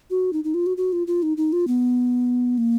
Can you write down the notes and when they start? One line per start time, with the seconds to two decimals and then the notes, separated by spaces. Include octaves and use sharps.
0.10 F#4
0.33 D#4
0.44 D#4
0.54 F4
0.66 F#4
0.77 F#4
0.93 F4
1.07 F4
1.23 D#4
1.37 D#4
1.53 F4
1.67 B3
2.58 A#3